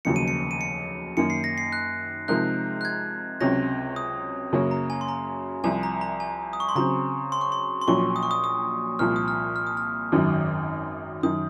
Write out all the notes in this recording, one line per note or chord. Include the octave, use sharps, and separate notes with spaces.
F1 D#2 C#3 F#3 C#7
D#7
C#7
D#7
C#7
F#2 D#3 A#3 C#7
C7
A#6
C7
F#6
C3 F3 G#3 D#4 A#4 F#6
F#6
G#6
C#2 C3 F#3 C#4 A#6
D#6
F#2 C#3 F#3 A#3 C#4
A#5
G#5
C6
A#5
C2 C3 F3 G#5
A#5
A#5
G#5
D#6
C#6
C6
C#3 F#3 C4 A#5
C6
C#6
C6
C6
A#1 A#2 F#3 C#4 C#6
D#6
C#6
D#6
D#6
C2 A#2 F3 F6
D#6
F6
F6
D#6
F6
G#1 F#2 D#3 F#3
F#2 D#3 D#6